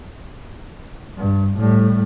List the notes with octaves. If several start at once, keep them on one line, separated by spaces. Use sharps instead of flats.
G2
A2 G3